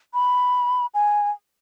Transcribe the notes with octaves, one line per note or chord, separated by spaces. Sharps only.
B5
G#5